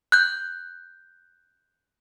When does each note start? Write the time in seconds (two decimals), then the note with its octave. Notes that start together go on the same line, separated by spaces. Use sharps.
0.12 F#6 G6